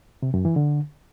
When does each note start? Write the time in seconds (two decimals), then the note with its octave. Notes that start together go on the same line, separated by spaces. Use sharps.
0.22 C3
0.34 F#2
0.45 E3
0.56 D3